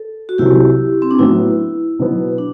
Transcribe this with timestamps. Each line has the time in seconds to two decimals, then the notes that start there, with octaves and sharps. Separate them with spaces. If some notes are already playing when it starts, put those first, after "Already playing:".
Already playing: A4
0.29 F#4
0.38 C2 C3 F#3 E4 G4
1.02 C4
1.11 D4
1.19 A2 F#3 B3 E4
1.99 B2 F#3 B3
2.38 D4